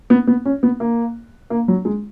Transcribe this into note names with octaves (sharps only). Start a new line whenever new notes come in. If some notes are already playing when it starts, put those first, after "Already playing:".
B3
B3
C#4
B3
A#3
A#3
F#3
G#3